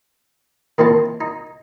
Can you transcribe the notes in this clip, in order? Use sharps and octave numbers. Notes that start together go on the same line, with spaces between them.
A#2 D#3 C4 E4 A5
D#4